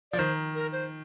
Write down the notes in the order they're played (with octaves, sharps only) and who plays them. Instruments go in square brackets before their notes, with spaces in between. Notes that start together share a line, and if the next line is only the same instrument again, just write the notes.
[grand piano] F3 [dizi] D5
[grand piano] D#3 [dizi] C5
[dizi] A#4
C5